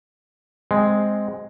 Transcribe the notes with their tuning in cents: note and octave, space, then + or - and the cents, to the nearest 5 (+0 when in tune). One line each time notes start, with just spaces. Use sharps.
G#3 +0 C4 +0